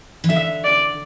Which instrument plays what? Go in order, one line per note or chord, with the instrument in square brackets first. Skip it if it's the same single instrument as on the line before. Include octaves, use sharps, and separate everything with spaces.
[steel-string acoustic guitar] E3
[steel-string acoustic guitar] D3 [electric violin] E5
[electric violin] D5